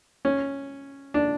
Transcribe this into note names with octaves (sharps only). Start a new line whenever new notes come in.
C#4
D4